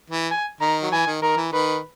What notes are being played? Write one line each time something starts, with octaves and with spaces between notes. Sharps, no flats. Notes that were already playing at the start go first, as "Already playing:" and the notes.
E3
G#5
D#3 A#5
F#3
E3 G#5
D#3
D#3 A#4
E3
D#3 B4